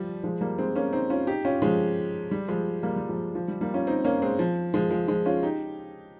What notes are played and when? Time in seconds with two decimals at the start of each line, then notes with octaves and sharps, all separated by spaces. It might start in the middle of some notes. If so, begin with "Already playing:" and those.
Already playing: F3 G3
0.23 F3 G#3
0.41 G3 A#3
0.58 G#3 C4
0.76 A#3 C#4
0.93 C4 D#4
1.10 C#4 F4
1.27 D#4 G4
1.45 C#4 F4
1.62 F3 G#3
2.31 G3
2.48 F3 G#3
2.83 G3 A#3
2.96 G3
3.09 F3 G#3
3.35 F3
3.48 G3
3.61 G3 A#3
3.74 C#4 F4
3.87 C4 D#4
4.05 A#3 C#4
4.22 G#3 C4
4.39 F3
4.74 F3 G#3
4.90 F3 G#3
5.08 F3 G#3
5.26 C#4 F4
5.43 D#4 G4